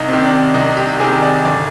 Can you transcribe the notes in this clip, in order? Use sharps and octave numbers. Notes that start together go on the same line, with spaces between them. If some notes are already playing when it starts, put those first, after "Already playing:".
Already playing: C2 D#4
C3 D#3
D4
C2 D#4
G4
C3 D#3 G#4
D5
G1 D5